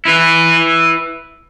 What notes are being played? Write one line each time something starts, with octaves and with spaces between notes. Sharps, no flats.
E4 B4